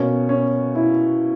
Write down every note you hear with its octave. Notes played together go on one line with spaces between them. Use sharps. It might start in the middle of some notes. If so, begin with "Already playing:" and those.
Already playing: B2 A#3 C#4
C#4
E4